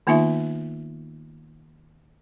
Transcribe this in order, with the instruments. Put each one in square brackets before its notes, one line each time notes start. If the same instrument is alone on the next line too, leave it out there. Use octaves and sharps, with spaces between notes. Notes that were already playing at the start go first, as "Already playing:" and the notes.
[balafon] D#3 A#3 B3 D#4 F4 E5